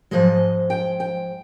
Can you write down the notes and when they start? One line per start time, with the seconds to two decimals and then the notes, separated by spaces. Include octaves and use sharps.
0.11 G#2 F3 G#3 D#5
0.70 G5
1.00 G5